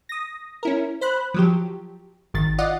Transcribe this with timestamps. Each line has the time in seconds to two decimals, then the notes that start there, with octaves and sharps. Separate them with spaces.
0.09 D#6 A#6
0.63 C#4 E4 A#4
1.01 C5 B5 F#6
1.34 F3 F#3 G4
2.34 G#1 D#3 A6
2.58 F4 D5 D#5 F#5